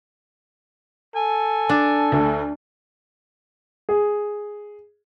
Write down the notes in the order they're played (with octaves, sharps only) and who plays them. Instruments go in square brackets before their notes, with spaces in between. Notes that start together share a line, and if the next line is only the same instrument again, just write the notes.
[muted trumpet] A4 [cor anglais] G#5
[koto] D4
[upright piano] D2 D3
G#4